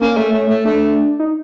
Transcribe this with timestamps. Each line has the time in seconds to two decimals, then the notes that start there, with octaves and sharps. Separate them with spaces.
0.01 A#3 C#4
0.17 A3
0.33 A3
0.49 A3
0.65 A3 D4
1.19 D#4